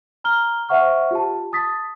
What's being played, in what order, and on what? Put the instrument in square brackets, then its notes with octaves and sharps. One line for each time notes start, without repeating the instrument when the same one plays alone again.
[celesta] A#5 F6 G7
C5 E5 F#5 C#6 F6
F4 G4 A5
A5 D#6 A6 B6